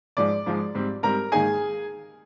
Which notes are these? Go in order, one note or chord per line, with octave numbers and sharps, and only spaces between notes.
G#2 F3 G#3 D5 D6
G#2 F3 G#3
G#2 G3 C4
G#2 G3 C4 A#4 A#5
G#2 D#3 A#3 D#4 G#4 G#5